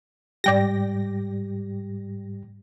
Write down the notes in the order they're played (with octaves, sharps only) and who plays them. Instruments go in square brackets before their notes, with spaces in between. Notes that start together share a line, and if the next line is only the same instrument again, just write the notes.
[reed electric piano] G#2 G3 G4 [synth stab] D5 G5 A#6